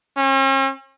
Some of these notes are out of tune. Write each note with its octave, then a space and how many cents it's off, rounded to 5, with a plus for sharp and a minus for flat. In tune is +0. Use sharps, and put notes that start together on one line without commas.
C#4 -45